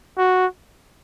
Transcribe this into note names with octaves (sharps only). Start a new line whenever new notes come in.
F#4